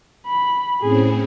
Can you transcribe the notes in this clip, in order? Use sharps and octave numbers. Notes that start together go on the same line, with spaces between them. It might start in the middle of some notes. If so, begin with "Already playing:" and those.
B5
A2 C4 C#4 G#4